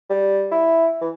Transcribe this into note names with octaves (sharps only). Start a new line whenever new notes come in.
G3
E4
E3